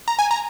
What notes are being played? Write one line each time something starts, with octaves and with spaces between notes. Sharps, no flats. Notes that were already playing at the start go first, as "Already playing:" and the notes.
A#5
G#5
A#5